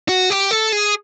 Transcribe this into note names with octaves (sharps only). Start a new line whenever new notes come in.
F#4
G4
A4
G#4